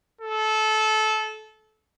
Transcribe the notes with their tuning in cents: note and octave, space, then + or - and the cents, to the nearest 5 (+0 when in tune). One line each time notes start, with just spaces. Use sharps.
A4 -20